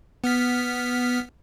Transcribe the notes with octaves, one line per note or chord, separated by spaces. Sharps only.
B3 F6 B6